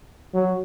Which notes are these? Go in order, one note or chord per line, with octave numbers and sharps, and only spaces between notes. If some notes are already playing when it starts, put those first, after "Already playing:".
F#3